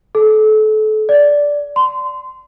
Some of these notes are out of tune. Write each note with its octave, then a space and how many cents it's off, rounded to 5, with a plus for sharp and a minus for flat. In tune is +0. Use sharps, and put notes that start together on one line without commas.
A4 -30
D5 -10
C6 -25